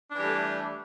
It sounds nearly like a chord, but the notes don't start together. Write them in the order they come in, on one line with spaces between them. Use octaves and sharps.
D4 E3 G3 A3